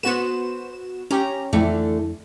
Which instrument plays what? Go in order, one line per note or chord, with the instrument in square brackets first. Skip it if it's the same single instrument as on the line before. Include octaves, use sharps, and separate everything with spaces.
[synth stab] B3 F#4 E7 [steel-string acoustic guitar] B4 C5
[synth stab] C#4 G4 [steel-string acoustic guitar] A#5
[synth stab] F2 [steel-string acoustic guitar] D3 E3 A3